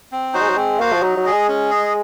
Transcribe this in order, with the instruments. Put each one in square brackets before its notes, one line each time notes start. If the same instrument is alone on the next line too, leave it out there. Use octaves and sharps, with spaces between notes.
[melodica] C4
[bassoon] F#3 [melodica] D#4 F#4 C5
[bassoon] G#3
F#3
[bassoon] G#3 [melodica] C4
[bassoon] A#3 [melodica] F#4 C5 F5
[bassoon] F3
[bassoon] F#3 [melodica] D#4
[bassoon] F#3
[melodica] G#4 D#5
[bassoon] G#3
[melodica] C#4
G#4 D#5